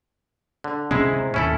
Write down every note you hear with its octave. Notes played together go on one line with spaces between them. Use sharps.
D3
C3 G#3 C#4 E4
C3
D#2 A2 C#4 E4 A4